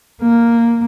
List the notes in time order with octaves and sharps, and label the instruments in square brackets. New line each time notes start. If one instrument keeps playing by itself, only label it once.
[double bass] A#3